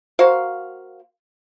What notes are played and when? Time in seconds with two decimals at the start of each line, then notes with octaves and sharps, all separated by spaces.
0.19 A#3 F#4 C5 F5